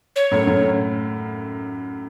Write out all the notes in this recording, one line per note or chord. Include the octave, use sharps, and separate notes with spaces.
C#5
F#2 A2
F#2 A2
F#2 A2